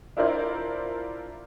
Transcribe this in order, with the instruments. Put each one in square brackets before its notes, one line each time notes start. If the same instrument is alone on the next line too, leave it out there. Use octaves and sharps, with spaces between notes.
[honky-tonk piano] D4 E4 F4 A#4 C5 D5